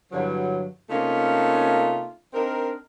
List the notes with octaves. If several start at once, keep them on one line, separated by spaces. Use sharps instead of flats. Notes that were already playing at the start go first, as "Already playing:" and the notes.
G2 D3 E3 F#3
C3 A3 A#3 C#4 D#4 F4
C4 D4 D#4 A#4